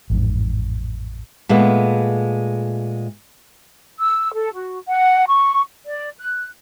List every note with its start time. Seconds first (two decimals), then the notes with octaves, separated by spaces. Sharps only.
0.10 A1 F2 G#2
1.49 A#2 G#3 A3 B3
4.00 E6
4.33 A4
4.54 F#4
4.88 F#5
5.26 C#6
5.85 D5
6.18 F#6